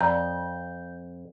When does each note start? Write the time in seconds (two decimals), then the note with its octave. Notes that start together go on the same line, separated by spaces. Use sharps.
0.01 F2 D5 A#5 G6